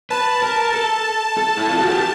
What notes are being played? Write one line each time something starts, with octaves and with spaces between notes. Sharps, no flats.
B4 A5
A#4
A4
A4
E4
F4
F#4
G4